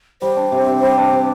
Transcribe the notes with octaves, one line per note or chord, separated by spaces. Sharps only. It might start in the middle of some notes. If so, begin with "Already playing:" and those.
G3 C5
D4
C3
C3
G3
D4
C3